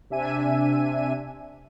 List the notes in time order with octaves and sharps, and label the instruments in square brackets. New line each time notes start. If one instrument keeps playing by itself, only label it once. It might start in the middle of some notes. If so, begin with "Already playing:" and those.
[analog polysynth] C3 D4 E5 G#5 D#7